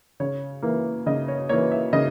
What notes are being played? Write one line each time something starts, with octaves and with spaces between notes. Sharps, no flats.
C#3 C#5
E3 A#3
C#3 D#5
C#5
E3 A#3 C#5
E5
C#3 D#5